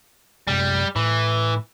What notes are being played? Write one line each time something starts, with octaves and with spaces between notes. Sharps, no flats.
F#2 C3 G3 G#3
A2 E3